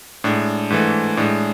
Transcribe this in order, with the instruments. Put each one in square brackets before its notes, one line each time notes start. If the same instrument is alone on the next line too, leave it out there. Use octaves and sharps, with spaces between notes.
[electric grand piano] A2 G#3 D4
G#2 E3 A3
A2 G#3 D4